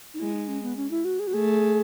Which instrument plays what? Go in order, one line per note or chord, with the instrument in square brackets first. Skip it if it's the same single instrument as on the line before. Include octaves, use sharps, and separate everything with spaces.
[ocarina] D#4
[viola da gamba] G#3 [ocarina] E4
[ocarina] D#4
C#4
B3
C#4
E4
F#4
G#4
F#4
[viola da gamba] A3 [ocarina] G#4